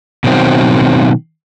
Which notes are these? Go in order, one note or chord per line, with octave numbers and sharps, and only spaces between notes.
B2 D#3 F#3 C4